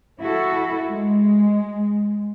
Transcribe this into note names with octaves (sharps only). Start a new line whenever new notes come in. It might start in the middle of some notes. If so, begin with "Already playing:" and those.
E4 F#4 A4
G#3